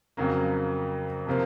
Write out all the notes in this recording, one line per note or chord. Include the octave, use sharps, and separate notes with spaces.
F2 C#3 F#3 A#3
C3 F3 A#3